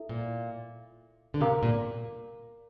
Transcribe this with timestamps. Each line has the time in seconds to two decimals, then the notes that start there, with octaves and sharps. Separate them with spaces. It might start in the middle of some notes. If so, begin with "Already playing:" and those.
Already playing: E4 A4 E5
0.09 A#2
1.34 D3
1.41 C3 A#4 F5 A#5 D6
1.63 A#2